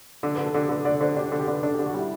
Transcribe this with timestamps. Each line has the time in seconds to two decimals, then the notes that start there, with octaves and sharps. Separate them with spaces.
0.23 D3
0.35 B4
0.38 D3
0.46 A4
0.54 D3 G4
0.69 D3 B4
0.85 D3 D5
1.00 D3 C5
1.16 D4 G4
1.29 G4
1.32 D3
1.40 G4
1.48 D3 B4
1.63 D4 A4
1.74 G4
1.79 D3
1.86 F#4
1.94 G3 E4